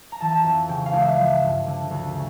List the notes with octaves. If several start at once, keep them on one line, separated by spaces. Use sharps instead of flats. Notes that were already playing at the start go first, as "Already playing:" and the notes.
A#5
E3 A5
F2
C#3 G5
F5
C#2
E5
F3
G2
D3
D2
C#3